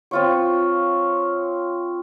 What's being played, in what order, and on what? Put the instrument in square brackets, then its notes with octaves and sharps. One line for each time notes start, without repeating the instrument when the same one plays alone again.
[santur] C4 F4 C#5